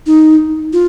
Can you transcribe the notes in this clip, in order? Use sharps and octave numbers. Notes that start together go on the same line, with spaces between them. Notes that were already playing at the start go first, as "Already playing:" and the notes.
D#4
F4